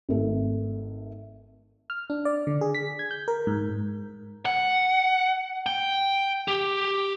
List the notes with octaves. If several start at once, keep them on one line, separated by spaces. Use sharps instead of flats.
G#1 A3
F6
D4
D5
D3
G#4
B6
G#6
G6
A#4
G#2
F#5
G5
G4